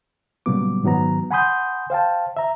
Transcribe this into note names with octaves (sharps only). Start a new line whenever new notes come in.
A#2 C#3 F#3 G3 B3 D6
G#2 D#3 F#3 B3 A#5
F#5 G#5 B5 C6 D#6 G6
C5 F5 G5 A5
E5 A#5